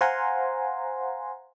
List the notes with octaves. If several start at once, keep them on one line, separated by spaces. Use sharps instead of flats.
C5 F5 F#5 G#5 A#5 C6